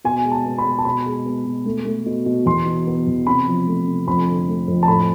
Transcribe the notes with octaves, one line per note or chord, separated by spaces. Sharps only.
B2 G#5
G#3
A5
B3
B5
B2
A5
B2 B5
G#3
B3
B2
A3
A3
B2
B2
E2 C6
B2
B3
E2
C3 B5
F3
A3
C3
F2 B5
D3
A3
F2
A5
A2 B5